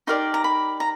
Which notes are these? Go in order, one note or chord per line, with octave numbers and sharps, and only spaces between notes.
D#4 G4 A#4 D5 C6
A#5
B5
A#5